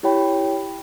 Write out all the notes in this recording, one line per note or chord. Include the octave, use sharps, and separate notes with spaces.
E4 G4 C#5 G5 B5